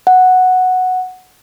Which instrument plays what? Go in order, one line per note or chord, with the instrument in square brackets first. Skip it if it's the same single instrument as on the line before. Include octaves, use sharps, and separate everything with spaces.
[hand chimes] F#5